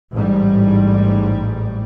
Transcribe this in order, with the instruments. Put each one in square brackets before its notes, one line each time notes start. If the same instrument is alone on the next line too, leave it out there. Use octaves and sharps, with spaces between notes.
[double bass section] A1 G#2 G3